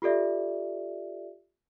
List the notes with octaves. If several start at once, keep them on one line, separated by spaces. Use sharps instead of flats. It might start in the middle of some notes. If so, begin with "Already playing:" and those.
F4 G4 A4 D5 E5